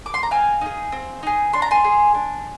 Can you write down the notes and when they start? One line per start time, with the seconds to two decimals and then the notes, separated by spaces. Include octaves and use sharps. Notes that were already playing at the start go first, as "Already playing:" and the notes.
0.06 D6
0.14 C6
0.23 A#5
0.31 C4 F5 G#5
0.61 D#4 G#4
0.92 C4
1.23 D#4 G#4
1.53 D4 C6
1.62 A#5
1.71 G#5 C6
1.84 G#4
2.15 D4